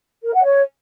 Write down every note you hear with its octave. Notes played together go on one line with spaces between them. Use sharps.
A#4
F#5
C#5